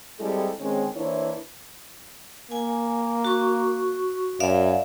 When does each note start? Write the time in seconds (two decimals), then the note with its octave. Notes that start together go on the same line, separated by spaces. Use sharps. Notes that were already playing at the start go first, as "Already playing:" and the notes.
0.20 G3 G#3 C4 E4 A4
0.60 D3 D#3 G#3 C4 C#4
0.96 E3 A#3 D4 E4 C5 C#5
2.51 A#3 G#5
3.25 F#4 C#6
4.40 F#2 D5 E5 F5